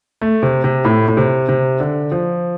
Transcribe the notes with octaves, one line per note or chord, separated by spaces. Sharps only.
A3
C3
C3
A2
A2
C3
C3
D3
F3